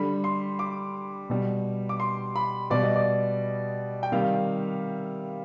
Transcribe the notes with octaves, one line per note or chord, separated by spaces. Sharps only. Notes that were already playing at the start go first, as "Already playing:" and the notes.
Already playing: D3 G3 B5
C6
D6
B2 G3
D6
C6
B5
B2 G3 D5
D#5
D5
G5
C3 D#3 G3 F5